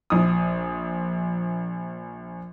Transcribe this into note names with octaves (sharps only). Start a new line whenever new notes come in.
A#1 D#6